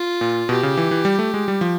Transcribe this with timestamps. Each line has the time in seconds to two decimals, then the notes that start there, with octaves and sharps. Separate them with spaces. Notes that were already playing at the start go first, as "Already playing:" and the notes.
Already playing: F4
0.21 A#2
0.49 B2 G4
0.63 C#3
0.77 E3
0.91 E3
1.05 G3
1.19 A3
1.34 G#3
1.48 G3
1.61 F3